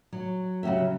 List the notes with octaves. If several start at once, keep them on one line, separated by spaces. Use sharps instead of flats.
F#3
C#3 F#3 F#4 G4 E5